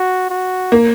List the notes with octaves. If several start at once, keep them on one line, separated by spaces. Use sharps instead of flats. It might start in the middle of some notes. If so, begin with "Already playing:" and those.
Already playing: F#4
F#4
A#3